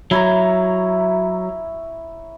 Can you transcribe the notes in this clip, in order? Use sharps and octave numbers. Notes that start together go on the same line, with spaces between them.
F#3 E4 C#5 A#5